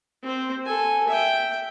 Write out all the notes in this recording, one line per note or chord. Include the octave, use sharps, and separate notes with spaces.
C4 C5
A4 G#5
E5 G5